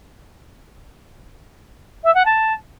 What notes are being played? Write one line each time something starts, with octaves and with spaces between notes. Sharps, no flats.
E5
F#5
A5